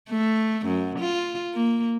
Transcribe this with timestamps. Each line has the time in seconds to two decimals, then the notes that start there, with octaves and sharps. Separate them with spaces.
0.10 A3
0.67 F#2
1.00 F4
1.54 A#3